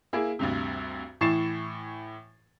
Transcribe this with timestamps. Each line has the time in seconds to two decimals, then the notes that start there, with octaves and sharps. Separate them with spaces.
0.13 A#3 E4 G#4
0.39 D2 G2 C3
1.21 A2 E3 C#6 A6 C7 E7